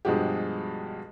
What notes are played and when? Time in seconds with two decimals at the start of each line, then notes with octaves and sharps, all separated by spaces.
0.05 G2 B2 F3 G#3 F#4 G4